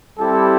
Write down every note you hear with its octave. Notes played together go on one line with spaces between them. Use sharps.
G3 C4 E4 G4 A4